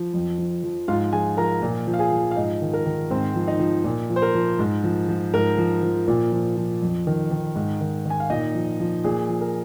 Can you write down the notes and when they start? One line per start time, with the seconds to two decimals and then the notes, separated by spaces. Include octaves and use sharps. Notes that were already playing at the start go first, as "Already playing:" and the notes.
Already playing: F3
0.14 F2
0.38 F3
0.63 F3
0.88 G#2 F4 F5
1.13 F3 G#4 G#5
1.37 F3 A#4 A#5
1.62 A#2
1.87 F3
1.93 F5
1.99 G#4 G#5
2.12 F3
2.31 F5
2.36 G#2 D#4 D#5
2.62 D#3
2.73 A#4
2.86 D#3
3.10 G#2 C4 C5
3.35 F3
3.48 D#4 D#5
3.60 F3
3.84 A#2
4.10 F3
4.16 C5
4.22 A#4
4.34 F3
4.59 G#2
4.84 F3
5.09 F3
5.34 G#2 A#4
5.58 F3
5.83 F3
6.08 A#2
6.32 F3
6.57 F3
6.82 F2
7.07 D#3
7.31 D#3
7.56 G#2
7.81 D#3
8.05 D#3 G#5
8.20 F5
8.30 A#2 D#4 D#5
8.55 F3
8.80 F3
9.04 A#2 G#4
9.29 F3
9.41 A#4